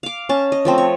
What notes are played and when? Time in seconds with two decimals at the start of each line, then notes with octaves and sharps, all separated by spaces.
0.03 F5 D6
0.29 C#4 A5
0.52 D#5
0.65 F3 A3 C4
0.78 C#5